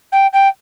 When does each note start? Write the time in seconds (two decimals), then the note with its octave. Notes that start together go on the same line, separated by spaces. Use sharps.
0.12 G5
0.33 G5